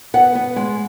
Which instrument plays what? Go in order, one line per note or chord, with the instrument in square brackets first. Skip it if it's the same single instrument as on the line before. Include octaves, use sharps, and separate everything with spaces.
[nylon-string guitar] B3 F#5
B3
G#3